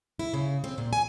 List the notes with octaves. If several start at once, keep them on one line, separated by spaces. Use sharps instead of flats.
E4
C#3
C4
A#2
G#5